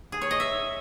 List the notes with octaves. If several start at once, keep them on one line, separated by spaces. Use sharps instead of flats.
G#4
C#5
D#5
E5